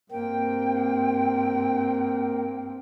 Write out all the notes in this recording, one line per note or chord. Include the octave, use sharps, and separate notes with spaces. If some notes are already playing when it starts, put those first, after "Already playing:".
G2 A#3 C4 G5